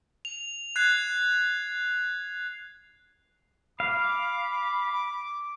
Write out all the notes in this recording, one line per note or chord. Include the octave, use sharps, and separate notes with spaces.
F7
F#6 G#6 C7
F5 B5 D6